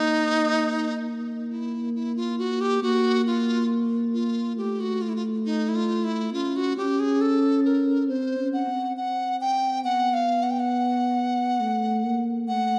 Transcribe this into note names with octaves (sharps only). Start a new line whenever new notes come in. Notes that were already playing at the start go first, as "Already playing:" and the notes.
Already playing: A#3 D#4
D#4
E4
E4
F4
F#4
G4
A#3 F#4
F4
F4
A3 G4
F#4
F4
E4
F4
D#4
E4
F4
E4
C#4 F4
F#4
C#4 G4
G#4
A4
A#4
C4 C5
C#4
F#5
C4
F#5
G5
B3 F#5
F5
F#5
G5
F#5
A3
A#3
A3 F#5